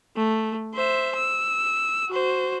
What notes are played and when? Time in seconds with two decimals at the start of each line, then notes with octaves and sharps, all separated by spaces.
0.17 A3
0.74 C5 E5
1.16 E6
2.10 F#4 C5